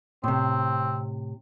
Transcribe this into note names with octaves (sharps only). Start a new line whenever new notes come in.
A2 C3 C4